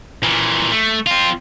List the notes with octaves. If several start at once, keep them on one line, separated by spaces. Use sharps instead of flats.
A#2 E3
A3
C4 F4